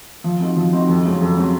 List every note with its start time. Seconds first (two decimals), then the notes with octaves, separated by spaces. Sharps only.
0.24 F3
0.40 C4 D#4 F#4
0.56 F3
0.73 C4 D#4 F#4
0.88 F2
1.05 C#3 F#3 C4
1.21 F2
1.37 C#3 F#3 C4